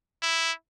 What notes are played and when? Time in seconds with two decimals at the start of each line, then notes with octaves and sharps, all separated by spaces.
0.22 E4